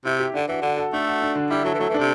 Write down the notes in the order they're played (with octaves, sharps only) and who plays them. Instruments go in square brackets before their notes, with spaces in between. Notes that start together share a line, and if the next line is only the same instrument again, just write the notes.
[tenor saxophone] C3 [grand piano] E4
[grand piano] G4
[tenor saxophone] D3 [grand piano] D4
[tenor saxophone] E3 [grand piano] F#4
[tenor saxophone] D3 [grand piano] F#4
[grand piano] A4
[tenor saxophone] A3 [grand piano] D4
[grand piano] F#4
D4
D3
[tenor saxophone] G3 [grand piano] E4
[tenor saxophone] F#3 [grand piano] A4
[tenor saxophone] E3
[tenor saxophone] F#3 [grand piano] A3
[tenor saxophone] E3
[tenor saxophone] C3 [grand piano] D4